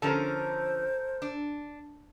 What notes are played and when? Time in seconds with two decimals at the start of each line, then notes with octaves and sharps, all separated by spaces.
0.02 D3 F3 C#4 A4 A#4 C5
1.22 D4